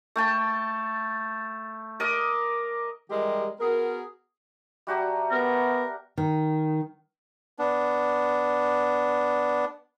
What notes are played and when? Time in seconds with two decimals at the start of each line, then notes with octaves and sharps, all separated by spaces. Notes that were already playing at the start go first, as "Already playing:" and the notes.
0.16 A3 G5 A5
2.00 A#4 D#5 D6
3.11 E3 G3 G#3 G4 A#4
3.61 B3 F#4 G#4 A#4
4.87 G3 F#4 G4 E5 A5 A#5
5.31 B3 A#4
6.18 D#3
7.59 B3 D4